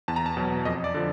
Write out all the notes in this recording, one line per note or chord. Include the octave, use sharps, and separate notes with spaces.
E2 A5
A#5
A5
B2 F#3
F2 D#5
D5
D3 F3